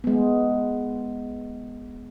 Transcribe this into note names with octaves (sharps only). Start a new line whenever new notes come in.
G#3 B3